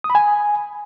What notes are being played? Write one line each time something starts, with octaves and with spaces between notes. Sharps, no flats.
D#6
B5
G#5